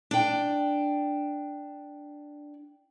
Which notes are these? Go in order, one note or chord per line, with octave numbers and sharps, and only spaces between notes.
D4 G5